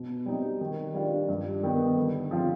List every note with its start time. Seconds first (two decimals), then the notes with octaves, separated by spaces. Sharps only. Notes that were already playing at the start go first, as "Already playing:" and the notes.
Already playing: B2
0.26 G3 C4 D#4
0.61 D#3
0.94 G3 D4 F4
1.28 G2
1.63 D#3 B3
1.97 D3
2.31 F3 C4 F4